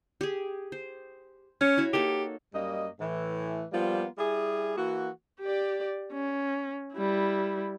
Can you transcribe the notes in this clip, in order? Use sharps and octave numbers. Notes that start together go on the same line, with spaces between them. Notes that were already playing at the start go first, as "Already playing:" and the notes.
G4 G#4
C5
C#4 C#5
E4 F#4 C#5
A#3 D#4 G4 A4
F#2 G3 A#3 D#5
A2 E3
F3 G3 A#3 B3 F4
G3 E4 G#4
E3 A#3 F#4
G4 D5
C#4
G3 E4